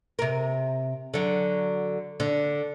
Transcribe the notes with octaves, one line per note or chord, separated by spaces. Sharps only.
C3 A#4
D3 F#3
D3